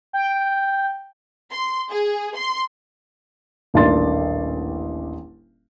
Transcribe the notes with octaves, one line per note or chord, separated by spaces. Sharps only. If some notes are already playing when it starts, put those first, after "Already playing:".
G5
C6
G#4
C6
D#1 A1 A#3 D4 C6 A6